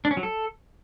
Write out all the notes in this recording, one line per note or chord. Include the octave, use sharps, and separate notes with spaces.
D4
C#4
F#3
A4